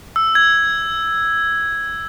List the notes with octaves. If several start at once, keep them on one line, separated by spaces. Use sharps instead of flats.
E6
G#6